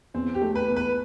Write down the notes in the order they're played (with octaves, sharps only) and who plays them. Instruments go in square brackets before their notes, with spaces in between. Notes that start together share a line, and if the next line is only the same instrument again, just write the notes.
[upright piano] E2 [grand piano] C4
[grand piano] G4
[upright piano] A3
[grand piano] B4
[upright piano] E2
[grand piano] B4